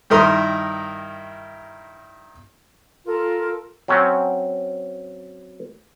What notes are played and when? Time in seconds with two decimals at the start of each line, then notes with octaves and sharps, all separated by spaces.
0.10 G2 D#3 E4 A#4 C6 D#6
3.06 F4 A4 A#4
3.88 F#3 C4 C#4